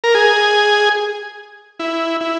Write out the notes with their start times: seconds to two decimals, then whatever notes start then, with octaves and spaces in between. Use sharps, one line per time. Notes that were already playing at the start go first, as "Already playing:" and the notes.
0.04 A#4
0.15 G#4
1.79 E4
2.21 E4